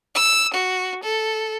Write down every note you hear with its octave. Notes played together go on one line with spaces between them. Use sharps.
E6
F#4
A4